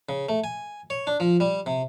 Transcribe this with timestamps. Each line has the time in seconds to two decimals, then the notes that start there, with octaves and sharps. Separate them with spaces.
0.09 C#3
0.29 A3
0.44 G#5
0.90 C#5
1.07 D4
1.20 F3
1.40 G3
1.66 C3